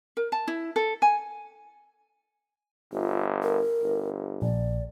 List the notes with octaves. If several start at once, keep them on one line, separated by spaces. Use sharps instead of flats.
A#4
A5
E4
A4
G#5
G1 F4
A#4
G1
A#1 D5